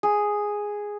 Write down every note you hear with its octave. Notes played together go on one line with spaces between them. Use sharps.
G#4